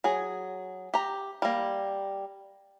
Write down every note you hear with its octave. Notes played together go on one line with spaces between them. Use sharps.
F#3 G#4
G4 A#5
G3 A#3